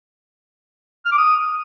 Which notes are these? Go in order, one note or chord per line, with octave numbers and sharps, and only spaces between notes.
F6
D6
D#6